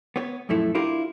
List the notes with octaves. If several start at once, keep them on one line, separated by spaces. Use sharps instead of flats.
B3 C#5
F#2 A#2 F3 A3 E4
D4 E4 F4 G4 A#4